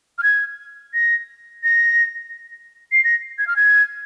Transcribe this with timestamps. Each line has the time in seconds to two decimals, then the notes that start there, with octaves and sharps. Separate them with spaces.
0.18 F6
0.23 G#6
0.94 A#6
1.64 A#6
2.92 C7
3.04 A#6
3.38 G#6
3.47 F6
3.56 G#6